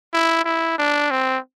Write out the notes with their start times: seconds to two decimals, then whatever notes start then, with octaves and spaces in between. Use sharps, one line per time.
0.14 E4
0.45 E4
0.78 D4
1.11 C4